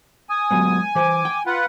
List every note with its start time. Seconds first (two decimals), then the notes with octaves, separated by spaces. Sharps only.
0.29 G#5 D#6
0.51 F#3 G#3 B3
0.95 E3 C5 D6
1.25 G5
1.46 F4 B4 F#5